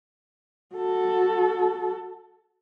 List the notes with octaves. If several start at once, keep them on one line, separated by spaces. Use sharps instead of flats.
F#4 A4